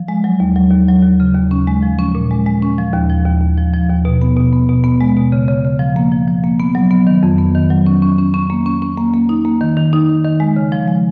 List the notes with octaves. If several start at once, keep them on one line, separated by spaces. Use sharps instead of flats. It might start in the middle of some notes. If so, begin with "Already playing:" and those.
Already playing: F3
G#3
F#3
D#2
F#3
D#2
F#3
D#2
C#3
D#2
C#4
G#3
F3
C#4
A#2
G#3
G#3
C#4
F3
D#2
F3
D#2
D#2
F3
F3
D#2
B2
B3
B2
B3
B2
B3
G#3
B2
C#3
C#3
C#3
F3
A#3
F3
F3
A#3
B3
F#3
B3
D#3
F2
B3
D#3
F#3
C#4
C#4
C#4
C#4
A#3
C#4
C#4
A#3
A#3
D#4
A#3
D#3
D#3
D#4
D#3
D#3
G#3
C#3
F3
G#3